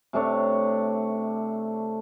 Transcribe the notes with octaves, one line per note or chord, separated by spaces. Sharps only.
C3 A3 D4 C#5